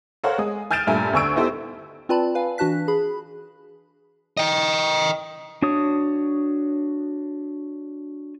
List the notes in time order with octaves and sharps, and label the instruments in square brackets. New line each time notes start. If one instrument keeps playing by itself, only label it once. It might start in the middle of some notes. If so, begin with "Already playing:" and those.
[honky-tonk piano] A4 A#4 C5 C#5 F5 F#5
G#3 D#6
G#5 F6 G6 A6 D7 E7
G2 A#2 A3 E5 G#5 A#5
D2 D3 G#5 C#6 E6 D7
B3 D#4 E4 G4 A4 C5
[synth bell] C4 F4 B4 D5 A5 B5
B4 F5 G#5
E3 D4 F#4 A5 F#6 B6
G#4 B5
[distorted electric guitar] D#5 G5
[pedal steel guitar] D4 F#4 C#5 D#6